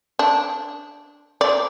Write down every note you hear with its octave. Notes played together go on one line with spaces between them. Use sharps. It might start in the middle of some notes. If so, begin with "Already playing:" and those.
D4
D5